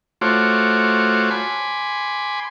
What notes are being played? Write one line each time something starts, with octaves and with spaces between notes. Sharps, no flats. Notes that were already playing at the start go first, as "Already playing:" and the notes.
A3 F4 F#4 C5 C#5 D6
G#5 B5 C6 D6